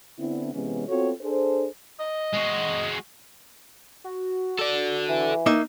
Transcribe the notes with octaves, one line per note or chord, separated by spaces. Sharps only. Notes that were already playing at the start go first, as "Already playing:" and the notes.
D3 B3 C4 D4 E4
C3 E3 G#3 B3 C#4
B3 C4 F4 F#4 A4 C#5
D4 G#4 A4 C5
D#5
G#3 F#4
F#4
A4 D5
E3
A#3 D#4 E5